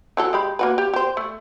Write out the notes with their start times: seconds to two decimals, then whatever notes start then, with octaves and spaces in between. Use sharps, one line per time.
0.17 E3 F#3 A4
0.33 G#3 G4 B5
0.59 A#3 F#4 B4
0.78 G4
0.94 G4 C5
1.17 A3